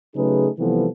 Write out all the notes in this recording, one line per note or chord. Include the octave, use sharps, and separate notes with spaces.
C#3 F#3 A3 D#4 G#4 B4
C3 E3 F3 G3 B3 A4